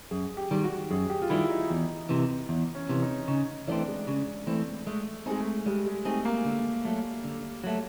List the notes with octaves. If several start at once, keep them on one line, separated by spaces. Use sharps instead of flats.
F#2 G#4
G4
D#3 G3
F#4
F#2 G#4
G4
F4
D#3 G3 E4
D#4
E2
C3 E3
E2
C#4
C3 E3
D#4
C#3 D#4
E3 A3 C4 D4
G#3
C#3 G#3
E3 A3 C4
G#3 A3
G#3 C4 D#4 G#4
A3
G3 G#3
G#3
A3 C4 D#4 G#4
A#3
D3
F#3 A3
D3
F#3 A3